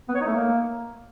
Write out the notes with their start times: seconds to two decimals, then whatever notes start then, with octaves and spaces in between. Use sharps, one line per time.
0.09 B3
0.15 C#5
0.21 D#4
0.27 A3
0.33 A#3